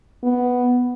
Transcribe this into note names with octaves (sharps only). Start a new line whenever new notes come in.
B3